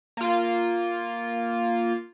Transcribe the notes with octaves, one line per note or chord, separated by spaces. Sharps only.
A#3 F4